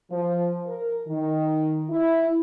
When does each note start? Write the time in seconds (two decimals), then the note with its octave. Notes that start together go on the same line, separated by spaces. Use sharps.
0.11 F3
0.66 A#4
1.07 D#3
1.89 E4